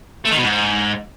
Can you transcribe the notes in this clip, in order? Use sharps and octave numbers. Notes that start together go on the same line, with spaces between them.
A3
D#3
B2
G#2